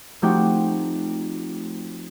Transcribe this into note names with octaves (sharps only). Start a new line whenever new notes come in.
F3 A3 C4 D#4 F#4 G4